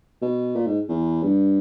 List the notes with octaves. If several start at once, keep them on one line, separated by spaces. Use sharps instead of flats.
B2
A#2
G#2
E2
G2